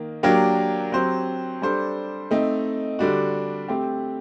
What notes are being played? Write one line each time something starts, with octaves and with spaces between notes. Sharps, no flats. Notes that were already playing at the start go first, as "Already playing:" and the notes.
Already playing: D#3 A#3
F#3 A#3 D4 G4 A#4
F#3 C4 G4 C5
G3 D4 A4 C5
A3 C4 D#4
D3 G3 D4 F#4
A3 C4 G4